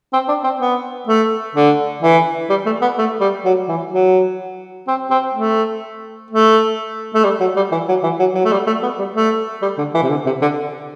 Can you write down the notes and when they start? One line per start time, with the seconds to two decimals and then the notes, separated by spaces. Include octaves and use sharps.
0.13 C4
0.28 D4
0.44 C4
0.60 B3
1.08 A3
1.55 D3
2.02 E3
2.49 G3
2.66 A3
2.82 B3
2.98 A3
3.21 G3
3.45 F#3
3.69 E3
3.92 F#3
4.88 C4
5.11 C4
5.34 A3
6.30 A3
7.14 A3
7.24 G3
7.40 F#3
7.56 G3
7.72 E3
7.89 F#3
8.03 E3
8.19 F#3
8.35 F#3
8.45 A3
8.52 G3
8.67 A3
8.83 B3
8.99 G3
9.15 A3
9.62 G3
9.78 D3
9.94 E3
10.03 C3
10.10 D3
10.26 C3
10.42 D3